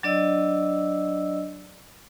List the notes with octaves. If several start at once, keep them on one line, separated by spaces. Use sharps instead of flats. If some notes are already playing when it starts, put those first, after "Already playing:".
F#3 D4 D5 D#5 E6